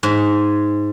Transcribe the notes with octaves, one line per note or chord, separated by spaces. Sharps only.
G#2